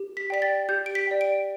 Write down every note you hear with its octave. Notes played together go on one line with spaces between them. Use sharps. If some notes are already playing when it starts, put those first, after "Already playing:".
Already playing: G4
B6
D5 G5 B6
A6
G4 G6
D7
B6
D5 G5
D7